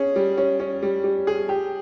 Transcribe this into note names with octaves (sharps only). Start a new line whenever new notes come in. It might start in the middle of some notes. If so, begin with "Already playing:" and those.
Already playing: C#4 G#4
G3
C#4
C#4
G3
G3
G#4
G4